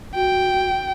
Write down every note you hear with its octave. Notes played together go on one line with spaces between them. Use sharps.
F#4 G5